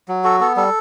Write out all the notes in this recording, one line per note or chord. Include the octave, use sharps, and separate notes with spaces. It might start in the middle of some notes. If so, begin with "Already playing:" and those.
F#3
F#4 A4
B3 A4
G3 A4